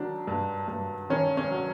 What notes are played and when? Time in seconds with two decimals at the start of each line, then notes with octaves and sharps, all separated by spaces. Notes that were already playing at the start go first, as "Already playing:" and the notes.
Already playing: D#3 F#3 D4
0.27 G2
0.68 G2
1.10 D#3 C#4
1.37 C#4
1.51 F#3